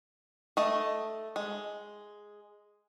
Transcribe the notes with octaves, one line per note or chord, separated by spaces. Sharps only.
A3 D#5
G#3